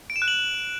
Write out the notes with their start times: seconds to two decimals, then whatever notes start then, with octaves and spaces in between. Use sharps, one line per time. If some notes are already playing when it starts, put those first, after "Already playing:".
0.10 D7
0.16 E7
0.22 F#6
0.28 F#7